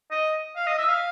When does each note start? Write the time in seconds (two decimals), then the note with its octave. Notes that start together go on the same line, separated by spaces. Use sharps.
0.11 D#5
0.56 F5
0.67 D#5
0.78 E5
0.88 F5